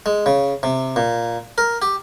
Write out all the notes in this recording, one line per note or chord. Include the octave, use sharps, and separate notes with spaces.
G#3
C#3
C3
A#2
A#4
G4